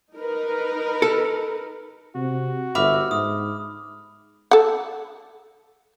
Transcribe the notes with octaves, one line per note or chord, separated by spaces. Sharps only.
D#4 A#4 B4
A4
C3 F#4
G1 E5 B5 D6 F6
G#2 D#6
A4 F#5